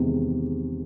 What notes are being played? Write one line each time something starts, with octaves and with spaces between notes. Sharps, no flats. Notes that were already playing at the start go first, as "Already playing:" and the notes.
Already playing: E2 C3 D#3 G#3